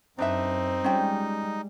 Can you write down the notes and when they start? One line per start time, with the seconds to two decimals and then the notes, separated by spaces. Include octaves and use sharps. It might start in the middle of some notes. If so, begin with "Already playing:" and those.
0.18 F#2 C4 D4 D#4 B4 E5
0.84 G3 G#3 C#4 F4 G5